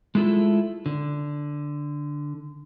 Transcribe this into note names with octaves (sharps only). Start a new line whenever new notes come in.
G#3 A3 E4 F4 A4
D3